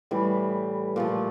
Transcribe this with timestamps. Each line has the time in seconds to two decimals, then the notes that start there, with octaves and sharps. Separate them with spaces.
0.11 A2 E3 G3
0.96 A#2 F3 A3